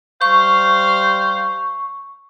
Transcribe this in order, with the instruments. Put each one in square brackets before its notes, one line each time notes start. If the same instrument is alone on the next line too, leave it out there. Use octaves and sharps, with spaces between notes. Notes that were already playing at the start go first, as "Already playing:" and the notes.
[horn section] G3 C5 F5 [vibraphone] C#6